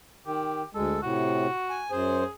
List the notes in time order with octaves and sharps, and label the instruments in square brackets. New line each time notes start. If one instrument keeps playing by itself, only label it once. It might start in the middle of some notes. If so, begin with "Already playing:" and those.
[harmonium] D#3 [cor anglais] G4
[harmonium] D2 G#3 [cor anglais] A4
[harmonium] A2 C3 [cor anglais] F#4
[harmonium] G#5
[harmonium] F#2 C5 [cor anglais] G#4